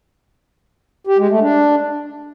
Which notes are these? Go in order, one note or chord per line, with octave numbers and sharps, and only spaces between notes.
G4
G#3
A3
D4